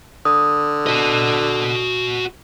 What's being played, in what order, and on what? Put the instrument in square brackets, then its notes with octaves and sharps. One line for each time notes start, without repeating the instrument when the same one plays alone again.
[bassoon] D3 [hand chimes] D#6
[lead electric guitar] F#4 D#5